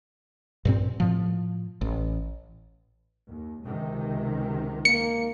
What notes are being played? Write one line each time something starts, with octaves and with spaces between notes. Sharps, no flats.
G2 A#2 C4
A2 F3
A1
D#2
C#2 C3 D#3
A#3 C#7